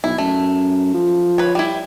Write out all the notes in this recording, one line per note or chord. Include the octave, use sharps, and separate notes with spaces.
B1 E4
F#2 A3
F3
B4 C#5
G3 E4